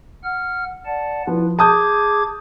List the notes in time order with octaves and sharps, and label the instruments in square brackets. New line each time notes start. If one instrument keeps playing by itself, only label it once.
[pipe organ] F#5 F6
D5 F#5 A5
[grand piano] F3 [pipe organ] E4 B4
[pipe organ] G#4 D6 G#6 [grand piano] A5 D#6 G6